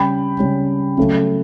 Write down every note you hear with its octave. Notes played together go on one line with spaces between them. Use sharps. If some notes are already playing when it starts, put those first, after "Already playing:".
Already playing: C#3 G3 C#4 G5 B5
C#3 G3 C#4
C#3 F#3 A3